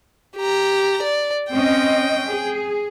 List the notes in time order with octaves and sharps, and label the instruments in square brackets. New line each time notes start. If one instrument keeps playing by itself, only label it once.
[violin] G4 A#5
D5
[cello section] C4 C#4 D#5 [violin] G5
[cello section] G#4